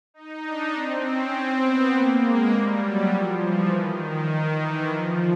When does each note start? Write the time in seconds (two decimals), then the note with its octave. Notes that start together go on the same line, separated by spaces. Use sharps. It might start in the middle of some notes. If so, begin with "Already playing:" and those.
0.14 D#4
0.43 D4
0.73 C4
1.03 C#4
1.32 C4
1.62 B3
1.91 A#3
2.21 G#3
2.50 G3
2.80 F#3
3.10 F3
3.39 E3
3.69 D#3
4.58 E3
4.88 F3